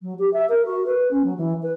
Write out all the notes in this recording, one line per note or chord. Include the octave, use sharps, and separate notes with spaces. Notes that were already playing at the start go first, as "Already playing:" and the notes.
F#3
G4
E5
A#4
F#4
B4
C#4
F#3
E3
B4